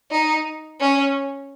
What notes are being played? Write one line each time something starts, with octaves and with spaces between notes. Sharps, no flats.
D#4
C#4